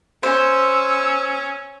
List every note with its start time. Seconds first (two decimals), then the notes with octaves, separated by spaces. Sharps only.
0.23 C#4 C5 E6